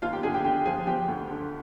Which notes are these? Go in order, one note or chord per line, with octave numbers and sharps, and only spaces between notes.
D#2 F4 F5
G4 G5
D3 G#4 G#5
G4 G5
D3 G4 G5
F3 G#4 G#5
F3 G4 G5
D2
D3